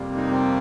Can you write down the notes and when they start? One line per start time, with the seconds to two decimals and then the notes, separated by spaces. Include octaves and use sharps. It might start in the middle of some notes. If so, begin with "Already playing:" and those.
Already playing: F2 C3 G3 A#3
0.16 D#4
0.31 C4